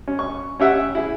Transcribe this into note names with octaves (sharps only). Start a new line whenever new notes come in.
C#4
C#6
C#4 G4 E5 F#5
E4 G#4